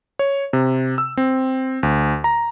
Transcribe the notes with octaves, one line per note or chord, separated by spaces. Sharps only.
C#5
C3
E6
C4
D2
A#5